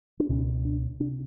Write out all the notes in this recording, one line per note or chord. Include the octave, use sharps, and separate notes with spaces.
D4
C#2 B2 C#4
D4
C3 D4